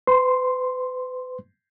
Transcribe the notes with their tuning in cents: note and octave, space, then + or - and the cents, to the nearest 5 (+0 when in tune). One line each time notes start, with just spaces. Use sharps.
B4 +40 C6 +0